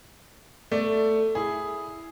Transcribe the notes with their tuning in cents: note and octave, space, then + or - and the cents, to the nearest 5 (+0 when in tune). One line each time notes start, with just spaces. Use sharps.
A3 +10 D5 +0
E4 +0 G#4 +0